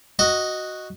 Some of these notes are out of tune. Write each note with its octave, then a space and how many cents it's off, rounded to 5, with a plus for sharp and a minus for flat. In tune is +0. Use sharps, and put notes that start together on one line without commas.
F#4 +0 D#5 +0